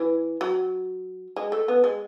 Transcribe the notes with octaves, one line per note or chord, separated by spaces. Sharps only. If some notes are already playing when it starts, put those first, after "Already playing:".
Already playing: E3
F#3
G#3
A3
B3
G#3